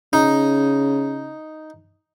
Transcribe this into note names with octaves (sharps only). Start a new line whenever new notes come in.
C#3 D#4